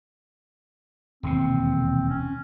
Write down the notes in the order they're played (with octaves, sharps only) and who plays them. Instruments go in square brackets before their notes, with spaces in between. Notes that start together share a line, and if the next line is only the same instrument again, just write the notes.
[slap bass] E1 D#2 C3 [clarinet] C4
[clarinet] C#4